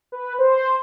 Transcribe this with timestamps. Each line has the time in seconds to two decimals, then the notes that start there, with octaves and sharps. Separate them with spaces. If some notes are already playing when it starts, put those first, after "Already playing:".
0.12 B4
0.39 C5